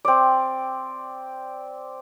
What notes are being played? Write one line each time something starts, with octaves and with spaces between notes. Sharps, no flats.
C4 D5